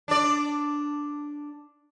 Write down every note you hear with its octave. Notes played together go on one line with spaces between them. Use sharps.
D4 D5